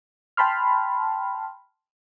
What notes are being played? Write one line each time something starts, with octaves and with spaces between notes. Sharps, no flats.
G5 A5 B5 C6 F6